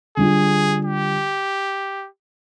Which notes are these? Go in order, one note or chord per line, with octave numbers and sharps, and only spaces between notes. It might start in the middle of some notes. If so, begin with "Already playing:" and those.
D3 G3 D4 F4 G#4
G4